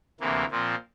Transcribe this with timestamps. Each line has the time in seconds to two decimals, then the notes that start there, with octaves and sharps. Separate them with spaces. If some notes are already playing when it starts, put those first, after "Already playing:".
0.20 D2 C3 E3 A#3
0.51 A#2 F3 C4